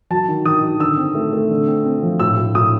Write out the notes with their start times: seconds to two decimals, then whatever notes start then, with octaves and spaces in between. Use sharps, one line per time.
0.10 F#3 A5
0.28 D#3
0.45 D#3 D#6
0.63 D#3
0.80 D3 E6
0.98 C4
1.15 A3
1.33 A3
1.50 D3
1.67 C4
1.85 C4
2.03 F3
2.20 A2 E6
2.37 A2
2.55 A2 D#6